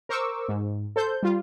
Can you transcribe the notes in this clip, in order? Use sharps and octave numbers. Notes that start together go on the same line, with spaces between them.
A#4 C5 C#6 D6 E6
G#2
A4 C5 G6
G3 F4